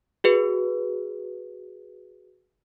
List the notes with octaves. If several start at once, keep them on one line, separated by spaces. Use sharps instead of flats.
F#4 G#4 B4